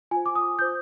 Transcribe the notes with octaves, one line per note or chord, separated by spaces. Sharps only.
F4 C5 G#5
D6
D#6
F4 C5 G6